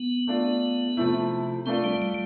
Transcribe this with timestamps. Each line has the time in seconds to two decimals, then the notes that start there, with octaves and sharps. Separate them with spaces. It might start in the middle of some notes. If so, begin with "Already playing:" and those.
Already playing: B3
0.27 A3 D4 F4
0.97 C3 F3 A3 E4
1.66 A3 C4 D4 F4 A4
1.84 G3
2.02 G3